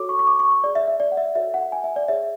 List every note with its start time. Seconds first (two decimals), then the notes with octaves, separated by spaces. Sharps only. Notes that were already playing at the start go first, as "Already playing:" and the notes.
Already playing: F#4 A4 C#5 D6
0.09 C#6
0.19 C#6
0.27 D6
0.39 C#6
0.51 C#6
0.64 G#4 D5
0.75 E5
0.87 E5
1.00 D5
1.12 F#5
1.17 E5
1.35 F#4 A4 C#5 E5
1.54 F#5
1.72 G#5
1.84 E5
1.96 D5
2.08 G#4 C#5 E5